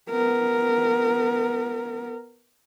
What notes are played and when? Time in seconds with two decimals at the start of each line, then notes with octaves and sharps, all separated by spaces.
0.10 B3 A#4